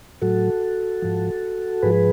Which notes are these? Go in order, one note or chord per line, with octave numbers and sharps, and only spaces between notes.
A2 F#3 F#4 A4
G#2 F3
G#2 F3 G#4 B4